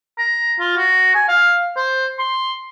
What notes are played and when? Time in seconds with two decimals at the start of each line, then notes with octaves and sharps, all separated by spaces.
0.18 A#5
0.60 F4
0.77 F#4
1.15 G#5
1.28 F5
1.76 C5
2.19 C6